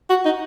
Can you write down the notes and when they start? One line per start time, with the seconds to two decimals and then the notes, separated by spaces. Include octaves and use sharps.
0.10 F#4
0.25 D#4